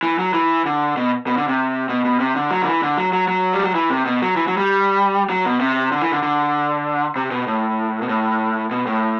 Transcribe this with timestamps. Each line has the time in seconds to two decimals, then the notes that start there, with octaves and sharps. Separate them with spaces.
0.03 E3
0.19 F#3
0.34 E3
0.66 D3
0.97 B2
1.27 B2
1.37 D3
1.48 C3
1.89 B2
2.05 B2
2.20 C3
2.36 D3
2.51 F#3
2.62 D3
2.67 E3
2.82 D3
2.97 F#3
3.13 F#3
3.28 F#3
3.53 G3
3.64 F#3
3.75 E3
3.90 C3
4.06 B2
4.22 F#3
4.36 E3
4.47 F#3
4.57 G3
5.30 F#3
5.45 B2
5.60 C3
5.92 D3
6.02 E3
6.12 D3
6.23 D3
7.16 C3
7.31 B2
7.47 A2
8.02 B2
8.09 A2
8.71 B2
8.87 A2